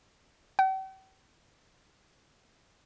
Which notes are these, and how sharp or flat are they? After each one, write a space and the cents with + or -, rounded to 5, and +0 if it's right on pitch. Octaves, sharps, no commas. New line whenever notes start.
G5 -45